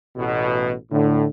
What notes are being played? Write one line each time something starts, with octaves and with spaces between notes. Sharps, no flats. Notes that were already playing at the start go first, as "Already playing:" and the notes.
A1 B2
A2 D3